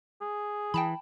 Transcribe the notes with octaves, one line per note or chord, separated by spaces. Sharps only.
G#4
E3 G5 A5 B5